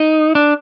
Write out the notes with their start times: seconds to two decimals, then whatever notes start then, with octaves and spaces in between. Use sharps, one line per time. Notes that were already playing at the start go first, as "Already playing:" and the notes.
Already playing: D#4
0.35 D4